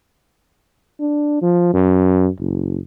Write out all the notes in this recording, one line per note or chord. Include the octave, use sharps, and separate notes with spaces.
D4
F3
F#2
F#1